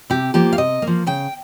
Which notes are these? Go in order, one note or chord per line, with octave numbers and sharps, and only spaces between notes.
C3 G4
F3 A#3 G4
F5
C3 D#5
A#3
F3
C#3 G5